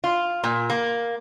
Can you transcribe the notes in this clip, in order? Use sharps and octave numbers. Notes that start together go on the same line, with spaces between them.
F4
A#2
A#3